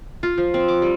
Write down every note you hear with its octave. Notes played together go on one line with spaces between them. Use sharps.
F4
F3
C4
D6
G3